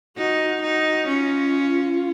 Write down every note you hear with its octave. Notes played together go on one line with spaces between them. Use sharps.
D#4 F#4
D#4 F#4
C#4 F4